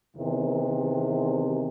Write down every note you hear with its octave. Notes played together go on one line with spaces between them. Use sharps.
E2 C3 D#3